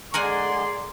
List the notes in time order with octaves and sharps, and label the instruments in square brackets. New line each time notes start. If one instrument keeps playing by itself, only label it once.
[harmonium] D3 G#3 [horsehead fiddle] G#4 D5 [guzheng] A#4 F#5 G#5 [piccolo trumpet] C6